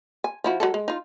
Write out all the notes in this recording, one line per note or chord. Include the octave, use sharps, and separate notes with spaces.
G#5
F3 E4 F#4
F#3 G#3 A4
G#3
D#4 F4